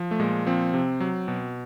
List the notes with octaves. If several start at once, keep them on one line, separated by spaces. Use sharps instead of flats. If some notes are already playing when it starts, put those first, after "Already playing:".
Already playing: F3
A3
A#2 G#3
F3 C4
C3
F#3
B2